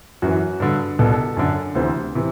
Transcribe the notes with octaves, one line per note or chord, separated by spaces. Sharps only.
F#2 E3 F#4
G2 D3
C2 B2 A4
F#2 D3
D2 C3 E3 C5
C3 E3